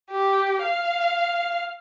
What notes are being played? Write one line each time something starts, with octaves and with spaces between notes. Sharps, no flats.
G4
F5